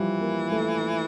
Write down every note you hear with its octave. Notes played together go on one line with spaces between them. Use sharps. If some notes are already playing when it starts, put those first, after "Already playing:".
Already playing: E3 F3 G3
A#3
A3